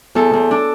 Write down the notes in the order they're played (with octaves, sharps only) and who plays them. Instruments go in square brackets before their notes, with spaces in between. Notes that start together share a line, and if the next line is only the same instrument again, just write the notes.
[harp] E2 A4
E2
D4